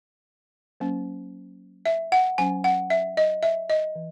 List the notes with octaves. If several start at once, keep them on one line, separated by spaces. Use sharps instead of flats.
F#3 A#3 C#4
E5
F#5
F#3 C#4 G#5
F#5
E5
D#5
E5
D#5
E3